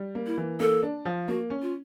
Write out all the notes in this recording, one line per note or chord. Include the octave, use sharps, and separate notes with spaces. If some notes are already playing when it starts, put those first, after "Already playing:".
Already playing: G3
A#3
E4
E3
A#3 A4
D4
F3
A#3 F#4
C#4
F4